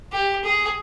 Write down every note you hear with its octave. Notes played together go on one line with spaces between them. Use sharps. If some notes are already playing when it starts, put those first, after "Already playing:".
G4
G#4